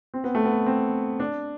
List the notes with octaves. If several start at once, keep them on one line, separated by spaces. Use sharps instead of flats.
C4
B3
A3
B3
C4
D4